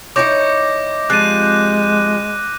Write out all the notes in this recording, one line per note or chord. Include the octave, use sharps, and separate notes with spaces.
D#4 E4 C#5 D6 G6 A#6
F3 G3 G#3 C4 F#6 D#7